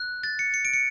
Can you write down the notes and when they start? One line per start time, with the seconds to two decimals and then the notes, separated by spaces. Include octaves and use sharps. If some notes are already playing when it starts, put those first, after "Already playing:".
Already playing: F#6
0.24 A6
0.39 C#7
0.54 C#7
0.65 D7
0.73 C#7